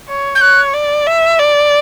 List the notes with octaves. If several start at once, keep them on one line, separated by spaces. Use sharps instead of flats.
C#5
G6
C#5 F#6
D5
E5
D5